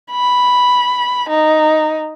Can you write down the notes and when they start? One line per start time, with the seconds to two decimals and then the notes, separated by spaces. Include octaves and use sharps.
0.11 B5
1.29 D#4